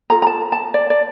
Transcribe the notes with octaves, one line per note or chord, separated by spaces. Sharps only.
F4 A4 A#5
A#5
A5
A5
D5
D5